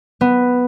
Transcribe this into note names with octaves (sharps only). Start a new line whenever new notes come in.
B3